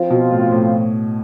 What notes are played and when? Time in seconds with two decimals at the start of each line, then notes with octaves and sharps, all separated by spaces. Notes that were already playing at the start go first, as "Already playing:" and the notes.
Already playing: F3 C4 F4
0.10 B2
0.31 A2
0.52 A2